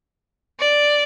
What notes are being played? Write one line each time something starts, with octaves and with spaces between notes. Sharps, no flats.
D5